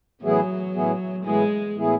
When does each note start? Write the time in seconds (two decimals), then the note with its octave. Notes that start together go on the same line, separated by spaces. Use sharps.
0.21 A2 E3 F#3 B3 E4 G#4
0.74 A2 E3 B3 E4 G#4
1.25 A2 E3 G#3 B3 E4 G#4
1.77 A2 E3 B3 E4 G#4